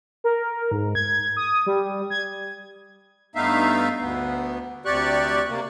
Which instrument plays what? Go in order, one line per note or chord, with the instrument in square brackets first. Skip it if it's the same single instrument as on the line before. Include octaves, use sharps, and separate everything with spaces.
[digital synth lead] A#4
G#2
G#6
D#6
G3
G#6
[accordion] G2 A3 B3 D#4 E5 F5
D2 B3
D2 C3 G4 D5 C#6 F#6
C3 A#3